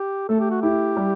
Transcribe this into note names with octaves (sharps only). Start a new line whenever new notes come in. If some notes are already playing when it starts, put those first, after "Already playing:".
Already playing: G4
A3 A4
G4
F#4
E4 G4
G3